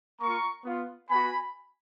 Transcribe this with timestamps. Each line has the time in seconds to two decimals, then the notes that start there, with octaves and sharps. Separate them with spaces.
0.20 A#3 F4 A#5 C#6
0.65 B3 F4
1.10 B3 F#4 G#5 B5